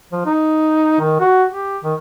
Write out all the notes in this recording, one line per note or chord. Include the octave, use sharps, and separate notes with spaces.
F3
D#4
D#3
F#4
G4
D#3